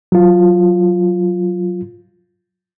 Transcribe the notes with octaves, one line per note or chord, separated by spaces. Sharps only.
F#3 F4